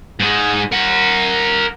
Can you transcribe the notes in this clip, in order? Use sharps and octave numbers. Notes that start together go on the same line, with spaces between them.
G#2 G#3
A#4 F#5